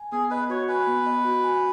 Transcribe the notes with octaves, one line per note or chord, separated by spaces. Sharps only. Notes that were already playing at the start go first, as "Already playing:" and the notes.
Already playing: G#5
B3 G#4
B4 D#5
F#4 C#5
B4 G#5
B3
D#5
F#4
G#5